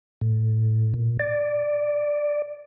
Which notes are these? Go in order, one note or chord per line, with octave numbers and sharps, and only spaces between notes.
A2
A#2
D5